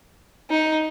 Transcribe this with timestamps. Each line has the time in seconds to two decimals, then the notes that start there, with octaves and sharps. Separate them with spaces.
0.50 D#4